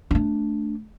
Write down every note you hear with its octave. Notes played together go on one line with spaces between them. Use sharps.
A3 D4